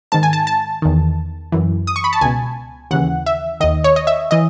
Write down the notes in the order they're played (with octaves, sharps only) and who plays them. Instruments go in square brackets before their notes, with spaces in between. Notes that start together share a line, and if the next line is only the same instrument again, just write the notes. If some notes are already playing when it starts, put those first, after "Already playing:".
[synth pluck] G#2 D#3 A5
G#5
A5
A5
E2 D#3
F#2 E3
D#6
C#6
B5
A5
C#2 B2 G#5
D#2 C#3 E3 F#5
E5
D#2 D#3 D#5
C#5
D#5
E5
E3 D#5